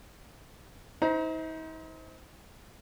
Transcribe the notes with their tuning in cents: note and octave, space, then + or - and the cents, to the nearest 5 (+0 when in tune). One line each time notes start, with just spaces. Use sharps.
D#4 +45 C5 -10 A#5 +30